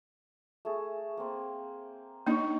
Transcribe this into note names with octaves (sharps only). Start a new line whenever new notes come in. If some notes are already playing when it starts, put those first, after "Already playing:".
A3 G#4
A#3 C4
A#3 D4 D#4 C#5 D#5